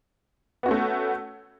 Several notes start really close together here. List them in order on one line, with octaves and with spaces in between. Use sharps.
B3 F#4 C#4 A3